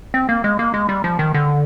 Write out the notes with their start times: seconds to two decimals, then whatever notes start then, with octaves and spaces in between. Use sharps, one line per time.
0.14 C4
0.29 A#3
0.44 G#3
0.59 A#3
0.74 G#3
0.89 G3
1.04 F3
1.19 D#3
1.34 D3